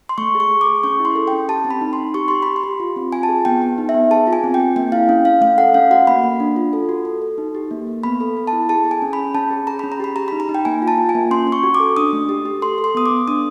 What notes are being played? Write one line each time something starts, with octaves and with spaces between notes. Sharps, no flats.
C6
A3 C#6
G#4
C#6
G#4
D6
G#4
C#4 C#6
E4
C6
A4
C#4 G5
G4 A5
C4
B5
D#4
C6
D#4
G4 C#6
G4 C6
G4 B5
C6
G4
F4
C4
F4 G#5
A5
G#4
B3 G5
B3
D#4
E5
B3
G#4 A5
F4
G#5
C4
G5
G#4
A#3 G5
E4 F5
C#4
C#4 F5
A3 F5
A4 F#5
C#4 F5
F#4 F#5
A#3 B5
A#3
D4
F4
A4
F#4
A4
A4
D#4
G4
A#3
A#3
B3 B5
A4
B3
A5
E4
G#4 A5
G#4
G#5
C#4
B5
C#4
C#4 A5
G#4
G#4 A#5
C#4 B5
A#5
G4 B5
G4 A#5
D#4 B5
A#5
D#4
G5
A#3 G#5
F4
A5
F4
G#5
A#3
C#4 C6
C#4
C#6
F#4
D6
A4
D4 D#6
A3
G4
G4
A4 C6
A4
C6
B3 D#6
D6
B3
D4 D#6